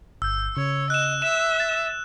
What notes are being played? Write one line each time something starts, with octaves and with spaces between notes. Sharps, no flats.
G1 E6 G6
C#3 C#5
D#5 F#6 E7
E5 E7
A6